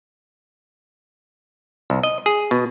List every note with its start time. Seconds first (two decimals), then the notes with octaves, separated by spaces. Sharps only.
1.90 C2
2.03 D#5
2.26 G#4
2.51 B2